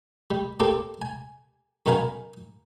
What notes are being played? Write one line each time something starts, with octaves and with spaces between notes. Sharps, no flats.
G3
A#3 C4 G4 A4
G#5
F#2 B2 B3 A#4 F5 G#5